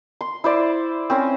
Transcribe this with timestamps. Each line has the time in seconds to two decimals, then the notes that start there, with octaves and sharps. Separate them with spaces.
0.21 C6
0.44 E4 C5 D5
1.10 C4 C#4 C5